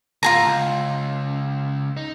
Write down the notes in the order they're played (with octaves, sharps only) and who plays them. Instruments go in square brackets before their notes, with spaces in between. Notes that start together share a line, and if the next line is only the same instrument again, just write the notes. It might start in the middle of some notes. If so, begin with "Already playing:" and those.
[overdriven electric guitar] D2 A2 [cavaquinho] F4 G#4 A#5
[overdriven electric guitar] C#2
D#4